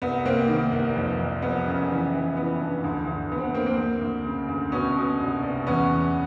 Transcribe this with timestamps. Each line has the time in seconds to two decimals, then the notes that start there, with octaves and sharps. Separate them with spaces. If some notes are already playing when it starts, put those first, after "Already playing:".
0.02 C2 B3
0.24 C2 A#3 C4
0.48 D#3 A#3
0.72 C2
0.96 F2
1.19 F2
1.42 F2 B3
1.66 C#3
1.90 E3
2.14 E3
2.36 E3 B3
2.60 G2
2.84 D2
3.07 D2
3.31 D2 B3
3.38 C4
3.43 B3
3.54 D2 A#3 C4
3.66 A#3 C4
3.78 D2
4.02 D2
4.25 C#3
4.49 D2
4.72 B2 B3 C#4
4.96 B2
5.19 C2
5.42 C2
5.66 E2 B3 C#4
5.90 E2